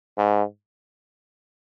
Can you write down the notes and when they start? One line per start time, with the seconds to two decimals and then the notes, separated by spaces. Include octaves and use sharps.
0.18 G#2